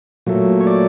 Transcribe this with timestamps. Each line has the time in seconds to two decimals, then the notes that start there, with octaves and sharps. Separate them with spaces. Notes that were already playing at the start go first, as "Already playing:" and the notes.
0.27 A#2 F#3 A3
0.60 C#5
0.67 D5